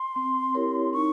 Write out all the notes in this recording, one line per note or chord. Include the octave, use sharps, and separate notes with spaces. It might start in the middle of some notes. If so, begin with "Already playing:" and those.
Already playing: C6
C4
E4 G4 A#4 C#5
D#4 C#6